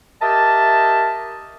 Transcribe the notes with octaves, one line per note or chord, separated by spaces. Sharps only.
G4 A#4 D#5 E5 A5